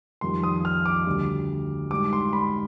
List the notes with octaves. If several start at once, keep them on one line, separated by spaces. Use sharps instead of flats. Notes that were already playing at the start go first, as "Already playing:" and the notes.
F2 D#3 G3 C6
D#6
F6
D6
D2 D3 G3
G#2 G3 D6
C6
B5